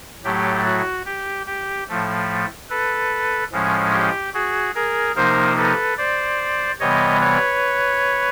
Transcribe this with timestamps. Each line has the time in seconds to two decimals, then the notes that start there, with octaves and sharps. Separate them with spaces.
0.24 A2 F#3 A3 G4
0.65 F#4
1.06 G4
1.47 G4
1.88 A2 F3 A3
2.70 A4 B4
3.52 A2 F3 G#3 C#4
3.93 G4
4.34 F#4 G#4
4.75 G#4 A#4
5.16 C3 F3 A#3 D#4 A#4 C5
5.57 A4 B4
5.98 C5 D5
6.80 C3 E3 G3 B3 C#5 D#5
7.21 B4 C#5